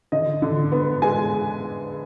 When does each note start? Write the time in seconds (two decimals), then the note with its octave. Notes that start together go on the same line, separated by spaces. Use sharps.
0.12 D3 D#5
0.42 D3
0.72 B3
1.02 G#3 G#5